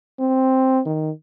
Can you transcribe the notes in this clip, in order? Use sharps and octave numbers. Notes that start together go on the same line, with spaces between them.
C4
D#3